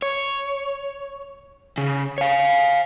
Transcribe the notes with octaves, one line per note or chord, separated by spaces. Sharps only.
C#5
C#3
C#5 F5